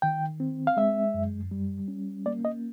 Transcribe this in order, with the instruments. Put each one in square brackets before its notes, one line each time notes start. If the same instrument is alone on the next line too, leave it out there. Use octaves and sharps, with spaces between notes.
[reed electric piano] D#3 G5
C4
F5
G#3 E5
F#2
G3
C#4
A#3 D5
D#5